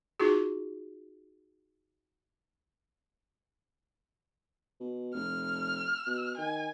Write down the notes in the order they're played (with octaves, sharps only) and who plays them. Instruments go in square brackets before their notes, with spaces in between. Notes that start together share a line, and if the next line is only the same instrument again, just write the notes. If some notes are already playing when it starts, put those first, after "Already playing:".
[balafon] D#4 F4 F#4 G#4
[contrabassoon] B2
[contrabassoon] F1 [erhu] F6
[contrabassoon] B2
[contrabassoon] D#3 [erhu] G#5